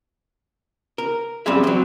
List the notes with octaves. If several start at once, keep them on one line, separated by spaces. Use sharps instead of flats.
A#4
F#2 G3 C4 G#4 E5
F#3 C4